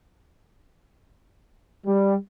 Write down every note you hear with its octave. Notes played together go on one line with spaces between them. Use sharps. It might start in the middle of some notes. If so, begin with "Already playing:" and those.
G3